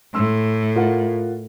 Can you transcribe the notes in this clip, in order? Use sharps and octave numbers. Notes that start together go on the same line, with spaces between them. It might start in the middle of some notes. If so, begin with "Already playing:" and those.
A2 C6 E6
F4 A#4 F#5